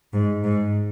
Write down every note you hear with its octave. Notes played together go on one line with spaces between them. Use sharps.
G#2
G#2